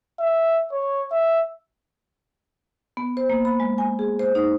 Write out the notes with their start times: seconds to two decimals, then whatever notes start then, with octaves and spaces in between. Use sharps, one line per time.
0.20 E5
0.72 C#5
1.12 E5
2.97 B3
3.17 C5
3.30 A#3
3.45 B5
3.60 G#3
3.78 G#5
3.99 G#4
4.19 C5
4.35 D#4